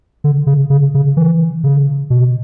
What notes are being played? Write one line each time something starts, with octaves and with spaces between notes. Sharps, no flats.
D3
C#3
C#3
C#3
E3
C#3
B2